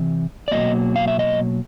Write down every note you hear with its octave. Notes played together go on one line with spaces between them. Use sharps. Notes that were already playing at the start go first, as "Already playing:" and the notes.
Already playing: C3 E3
D5
B2 F#3 A#3 D#5
F5
E5
D#5